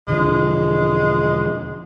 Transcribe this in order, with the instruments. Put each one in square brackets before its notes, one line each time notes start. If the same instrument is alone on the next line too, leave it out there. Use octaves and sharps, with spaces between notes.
[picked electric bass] E1 D3 F3 [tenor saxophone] G#3